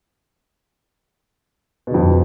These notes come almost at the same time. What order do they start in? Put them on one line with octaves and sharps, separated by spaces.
B2 D3 F2